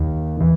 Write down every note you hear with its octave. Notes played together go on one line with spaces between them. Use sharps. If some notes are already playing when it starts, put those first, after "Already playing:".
Already playing: D#2 D#3
E3